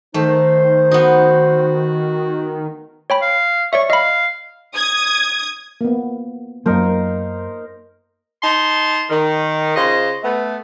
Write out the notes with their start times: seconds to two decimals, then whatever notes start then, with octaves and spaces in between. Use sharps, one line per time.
0.14 D#3 A3 D#4 C5
0.91 B3 D#4 F#4
3.10 C#5 G5 B5
3.22 F5
3.73 C#5 D5 E5 C#6
3.90 D#5 F5 B5
4.75 D#6 G#6
5.81 A#3 B3
6.66 F#2 F#3 A#3 D#4 A#4 C5
8.42 D#4 A5 C6
9.10 D#3
9.75 C#3 F4 C5 D#5
10.23 A3 B3